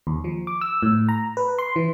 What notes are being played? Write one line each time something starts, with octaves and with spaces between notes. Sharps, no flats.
D#2
F3
D6
E6
A2
A#5
B4
C6
E3